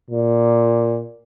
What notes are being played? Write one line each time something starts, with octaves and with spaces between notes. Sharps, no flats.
A#2